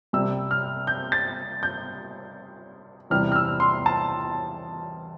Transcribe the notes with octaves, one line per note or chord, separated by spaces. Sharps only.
C2 C3 G3 E6
F6
G6
A6
G6
E2 C3 E3 G3 F6
F6
E6
C6
A5